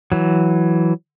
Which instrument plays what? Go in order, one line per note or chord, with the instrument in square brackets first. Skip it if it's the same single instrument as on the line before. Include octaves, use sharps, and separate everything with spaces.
[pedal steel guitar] E3 F#3